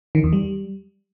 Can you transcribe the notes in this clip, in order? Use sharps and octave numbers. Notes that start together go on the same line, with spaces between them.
D#3
E2
G3